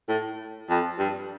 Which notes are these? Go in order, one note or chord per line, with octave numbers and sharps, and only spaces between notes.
A2
F2
G2